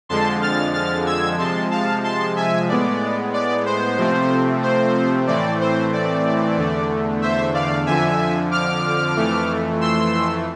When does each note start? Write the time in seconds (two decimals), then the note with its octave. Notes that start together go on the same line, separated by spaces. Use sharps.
0.09 F2 D3 F3 G#3 A5 C6
0.41 F6 A6
0.74 F6 A6
1.06 E6 G#6
1.38 C3 F3 G#3 A5 C6
1.71 F5 A5
2.04 A5 C6
2.36 E5 G#5
2.68 A2 G#3 B3 D5
3.33 D5
3.66 C5
3.98 C3 F3 A3 C4
4.63 C5
5.27 A2 E3 A3 C4 D5
5.60 C5
5.93 D5
6.57 E2 D3 A3
7.22 C5 E5
7.54 D5 F5
7.86 F2 D3 F3 E5 G#5
8.51 D6 F6
9.16 F2 E3 A3
9.81 C6 E6